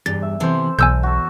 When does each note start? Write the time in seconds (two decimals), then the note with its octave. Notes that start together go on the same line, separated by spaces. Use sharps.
0.06 E2 G2 A6
0.22 E5
0.40 C3 E3 B3 A4 C5
0.79 B1 E2 G#5 E6 G6
1.03 F#4 A4